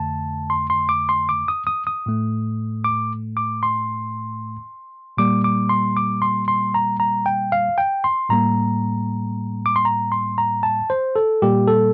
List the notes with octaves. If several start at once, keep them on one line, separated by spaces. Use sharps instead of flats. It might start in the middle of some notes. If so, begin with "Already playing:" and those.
Already playing: F2 D3 A3 A5
C6
C6
D6
C6
D6
D#6
D#6
D#6
A2 A3
D6
D6
C6
A#2 G3 A#3 D6
D6
C6
D6
C6
C6
A#5
A#5
G5
F5
G5
C6
A2 G3 A#3 A#5
D6
C6
A#5
C6
A#5
A5
C5
A4
A#2 G3 A#3 G4
A4